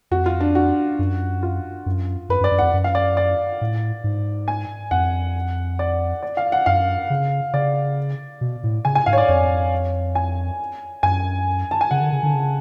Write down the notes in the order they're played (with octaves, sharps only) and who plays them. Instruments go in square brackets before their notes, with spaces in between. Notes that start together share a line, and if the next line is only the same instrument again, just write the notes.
[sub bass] F2 [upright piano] F#4
[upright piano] F4
D4
F#4
[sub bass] F#2
[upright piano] F4
[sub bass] F#2
[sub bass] F#2 [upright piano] B4
[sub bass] F#2
[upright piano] D5
[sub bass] F#2
[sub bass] F2 [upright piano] F#5
[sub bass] F#2
[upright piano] F5
D5
D5
[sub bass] A2
G#2
[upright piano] G#5
[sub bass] F2 [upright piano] F#5
[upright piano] D5
D5
F5
F#5
[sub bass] F#2 [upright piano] F5
[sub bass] C#3
[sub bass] C#3 [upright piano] D5
[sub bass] B2
A2
[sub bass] C#3 [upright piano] G#5
[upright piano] G#5
[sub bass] G#2 [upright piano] F5
[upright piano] C#5
D5
[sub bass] F2 [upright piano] C#5
[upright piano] G#5
[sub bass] F#2 [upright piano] G#5
[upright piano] A5
G#5
[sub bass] C#3 [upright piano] F#5
[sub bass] D3
C#3
D3
C#3